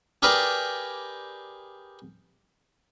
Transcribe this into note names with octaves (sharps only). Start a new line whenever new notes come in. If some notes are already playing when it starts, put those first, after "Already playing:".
G4 G#4 A#4 B4 D5